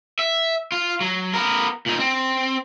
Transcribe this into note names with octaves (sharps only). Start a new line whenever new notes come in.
E5
F4
F#3
B3 A#4
A#2 D#4
C4